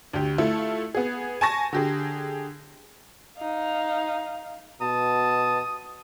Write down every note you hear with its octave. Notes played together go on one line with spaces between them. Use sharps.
D2 G4
A3 E4 F4 A4
B3 G#4
G#5 A5 C#6 A#6
D3 G4 G#4
D#4 F5
B2 A5 D#6